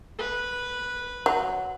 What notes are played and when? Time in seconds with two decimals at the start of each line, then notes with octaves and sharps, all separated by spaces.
0.18 B4
1.26 F#3